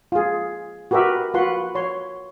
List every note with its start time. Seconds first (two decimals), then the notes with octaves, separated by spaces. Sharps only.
0.12 F4 G#4
0.91 F#4 G4 A#4 B4 E5
1.34 F4 F#4 B4 F#5 C6
1.75 C#5 C6